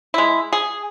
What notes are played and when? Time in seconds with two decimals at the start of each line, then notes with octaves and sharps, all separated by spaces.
0.14 G#3 E4
0.53 G#4